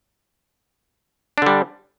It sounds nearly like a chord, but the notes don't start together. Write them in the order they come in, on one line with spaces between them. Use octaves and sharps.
D4 D3 G3